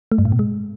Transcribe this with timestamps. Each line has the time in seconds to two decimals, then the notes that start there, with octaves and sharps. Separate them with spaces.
0.12 A3
0.18 G2
0.25 A2
0.32 B2
0.39 G#3